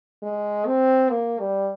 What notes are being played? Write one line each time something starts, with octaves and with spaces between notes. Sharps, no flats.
G#3
C4
A#3
G3